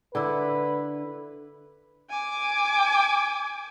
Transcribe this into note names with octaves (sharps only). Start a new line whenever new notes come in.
D3 E4 B4
G#5 D6